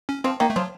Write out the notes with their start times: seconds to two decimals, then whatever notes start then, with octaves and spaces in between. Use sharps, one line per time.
0.09 C#4
0.24 F3 C4
0.40 D#3 A#3
0.50 A3
0.56 F3 F#3